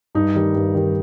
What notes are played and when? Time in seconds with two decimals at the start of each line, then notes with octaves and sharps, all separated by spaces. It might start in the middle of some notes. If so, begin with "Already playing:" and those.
0.15 G2 D#4
0.35 D#3 G3
0.55 G2
0.75 D#3 G3